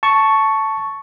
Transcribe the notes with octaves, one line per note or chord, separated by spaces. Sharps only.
A5 C#6